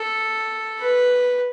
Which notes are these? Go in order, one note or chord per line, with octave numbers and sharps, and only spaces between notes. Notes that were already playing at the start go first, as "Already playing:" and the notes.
Already playing: A4
B4